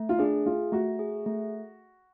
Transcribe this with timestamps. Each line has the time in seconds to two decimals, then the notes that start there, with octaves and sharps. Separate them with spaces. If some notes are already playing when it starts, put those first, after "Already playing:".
Already playing: A3
0.09 F4
0.19 D4 G#4
0.46 A3 F4
0.72 A3 F#4
0.99 G#4
1.26 A3